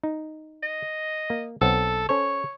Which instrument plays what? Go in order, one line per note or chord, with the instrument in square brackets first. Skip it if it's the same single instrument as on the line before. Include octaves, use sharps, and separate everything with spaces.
[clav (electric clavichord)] D#4
[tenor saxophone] D#5
[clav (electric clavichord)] A#3
[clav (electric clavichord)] B1 C4 F#5 [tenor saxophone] A4
[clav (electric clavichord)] C#4 A4 C5 [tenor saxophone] C#5